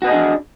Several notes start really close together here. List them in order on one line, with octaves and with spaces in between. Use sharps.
F#4 B4 D#5 G#4 D4